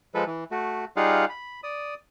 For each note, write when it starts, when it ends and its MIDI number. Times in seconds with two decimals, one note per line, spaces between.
0.15 0.24 53
0.15 0.24 56
0.15 0.24 69
0.15 0.24 71
0.27 0.44 52
0.51 0.85 57
0.51 0.85 66
0.97 1.25 55
0.97 1.25 63
0.97 1.25 65
0.97 1.25 68
0.97 1.25 77
0.97 1.25 78
1.29 1.61 83
1.63 1.95 74
1.63 1.95 87